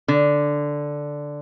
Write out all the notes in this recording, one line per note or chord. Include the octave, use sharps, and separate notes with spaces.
D3